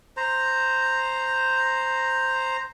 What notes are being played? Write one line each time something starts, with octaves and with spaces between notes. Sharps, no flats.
C5 A#5